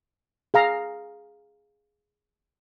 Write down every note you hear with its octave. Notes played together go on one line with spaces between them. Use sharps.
G#4 F5 A#5